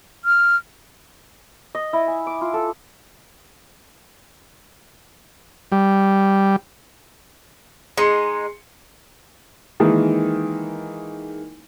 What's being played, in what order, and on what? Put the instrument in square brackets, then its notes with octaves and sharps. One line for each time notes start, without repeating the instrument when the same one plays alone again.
[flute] F6
[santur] D#5
E4
G#5
D6
F4
A4
[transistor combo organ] G3
[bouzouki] G#3 D#4 [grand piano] C6 C#7
[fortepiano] D#3 E3 G#3 A#3 D#4